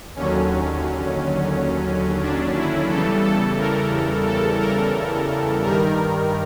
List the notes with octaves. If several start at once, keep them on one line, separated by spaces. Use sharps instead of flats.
D#2 D3 F#3 C#4
D4
E4
E2 C#3 E3 G3 A4
A4
A#4
A4
A#4
G2 D#3 G3 A#4